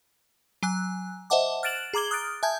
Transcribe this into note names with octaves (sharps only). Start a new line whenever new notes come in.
F#3 G#5 F#6
C5 D#5 E5 F#5 A5 D6
F6 F#6 A6 D7 E7 F#7
G#4 A#5 D6 G#6 G7
D#6 F6 F#6 A6 D7
E5 G#5 A5 G6 G#6